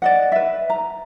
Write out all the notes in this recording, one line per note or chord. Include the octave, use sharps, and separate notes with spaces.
D5 D#5 F#5
B4 E5
A#5